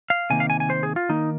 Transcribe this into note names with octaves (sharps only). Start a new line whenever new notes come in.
F5
C3 D#3 A#3 G#5
F5
G#5
G#5
C5
G#4
F4
D#3 A#3 D#4